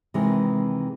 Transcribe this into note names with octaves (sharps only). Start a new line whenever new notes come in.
C3 D#3 E3 G#3